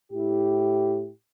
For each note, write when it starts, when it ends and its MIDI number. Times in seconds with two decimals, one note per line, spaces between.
0.13 1.09 45
0.13 1.09 64
0.13 1.09 67